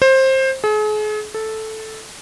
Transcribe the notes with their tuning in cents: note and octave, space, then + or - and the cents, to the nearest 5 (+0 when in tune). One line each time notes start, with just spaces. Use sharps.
C5 +20
G#4 +40
A4 -5